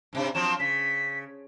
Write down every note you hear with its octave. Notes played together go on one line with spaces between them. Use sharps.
G#2 C3 D4
F3 F#3 C4 E7
C#3 B6